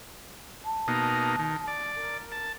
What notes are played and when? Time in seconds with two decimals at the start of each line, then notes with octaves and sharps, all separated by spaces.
0.64 A5
0.88 B2 A#3 D#4
1.39 D#3
1.67 D5
1.96 A#4
2.32 A5